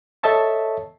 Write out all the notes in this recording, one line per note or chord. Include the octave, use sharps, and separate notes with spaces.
A4 C#5 D#5 E5 A5 C#6